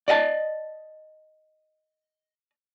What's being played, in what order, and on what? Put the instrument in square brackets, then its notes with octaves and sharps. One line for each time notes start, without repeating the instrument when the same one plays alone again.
[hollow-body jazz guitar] D5 D#5 F5 A5